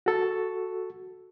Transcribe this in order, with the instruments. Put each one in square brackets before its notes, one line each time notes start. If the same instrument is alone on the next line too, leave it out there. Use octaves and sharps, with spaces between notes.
[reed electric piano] F#4 A4